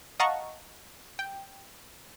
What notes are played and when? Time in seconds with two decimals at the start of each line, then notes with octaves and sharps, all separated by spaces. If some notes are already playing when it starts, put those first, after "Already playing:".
0.20 D#5 F5 F#5 A5 A#5 C#6
1.19 G5